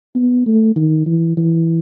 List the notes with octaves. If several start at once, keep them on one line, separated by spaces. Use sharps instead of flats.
B3
A3
D#3
E3
E3